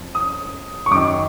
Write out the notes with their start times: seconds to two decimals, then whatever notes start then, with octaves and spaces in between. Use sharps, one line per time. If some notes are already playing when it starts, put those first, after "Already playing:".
Already playing: F2 F3
0.15 D#6
0.86 C#6
0.91 F#2 D#3 D6